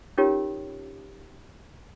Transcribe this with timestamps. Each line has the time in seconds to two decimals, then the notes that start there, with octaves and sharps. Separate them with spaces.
0.18 C#4 D#4 F4 G4 A#4 C#5